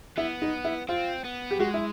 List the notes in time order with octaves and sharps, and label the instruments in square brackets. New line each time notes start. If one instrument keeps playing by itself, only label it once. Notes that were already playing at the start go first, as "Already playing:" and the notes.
[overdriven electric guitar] B3 [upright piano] E4
[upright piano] D#4
E4
[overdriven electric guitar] C4 [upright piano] F4
[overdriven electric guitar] B3
[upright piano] G4
[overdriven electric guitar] G#3 [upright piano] F#4
[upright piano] E4